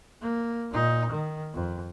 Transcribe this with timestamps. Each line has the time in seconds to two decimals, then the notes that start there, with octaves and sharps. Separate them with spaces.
0.21 A#3
0.71 A#2 D#4
1.10 D#3
1.54 F2